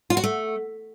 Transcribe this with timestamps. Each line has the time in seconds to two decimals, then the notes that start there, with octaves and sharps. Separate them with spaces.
0.10 F4
0.17 F#4
0.24 A3